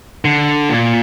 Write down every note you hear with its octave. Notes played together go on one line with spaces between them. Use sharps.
D3
A#2